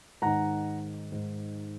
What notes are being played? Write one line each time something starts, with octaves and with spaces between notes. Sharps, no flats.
G#2 D#3 F#5 A#5
G#2 D#3